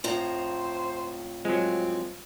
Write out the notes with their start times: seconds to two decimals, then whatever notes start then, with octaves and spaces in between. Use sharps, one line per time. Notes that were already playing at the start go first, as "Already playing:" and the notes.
0.04 F2 A2 C5 A#5
1.45 F3 F#3 G#3 C4